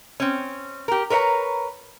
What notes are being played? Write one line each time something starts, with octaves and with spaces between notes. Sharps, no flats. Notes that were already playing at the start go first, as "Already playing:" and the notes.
C4 C#4
G4 A#4
A#4 B4 C#5 D5 A#5